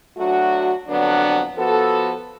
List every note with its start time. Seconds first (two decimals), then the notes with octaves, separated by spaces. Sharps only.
0.17 F#3 A3 D4 F#4
0.87 F2 D3 F#3 B3 D4
1.57 F3 B3 F#4 A4